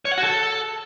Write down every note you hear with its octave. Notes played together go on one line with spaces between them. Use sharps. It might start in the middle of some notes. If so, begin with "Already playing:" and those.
C#5
F#5
F#4
A4